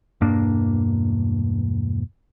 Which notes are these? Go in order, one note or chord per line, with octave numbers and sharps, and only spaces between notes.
E1 G2 A#3 D4